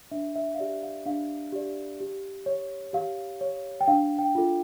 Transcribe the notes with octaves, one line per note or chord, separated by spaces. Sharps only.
D4 E5
E5
F5
G4 D5 E5
F5
D4 F5
G4 D5
G4
C#5
G4 F5
C#5
G5
D4 F5
G5
F4 A4